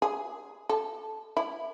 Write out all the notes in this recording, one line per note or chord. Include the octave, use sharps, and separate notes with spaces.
G#4
A4
E4